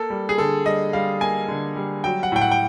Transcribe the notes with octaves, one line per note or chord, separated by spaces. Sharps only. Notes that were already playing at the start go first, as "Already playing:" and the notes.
Already playing: A#3 A4
G3
G#4
D3 A4
G3 D#5
G3 F5
A#3 G#5
D3
G3
F#3 G5
F#5
A2 G5
F#5
G5